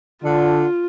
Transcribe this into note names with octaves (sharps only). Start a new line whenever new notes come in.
D3 F4